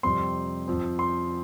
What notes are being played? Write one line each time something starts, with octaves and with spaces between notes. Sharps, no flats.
F2 C3 G3 C4 C6
F2 F3 C4
C6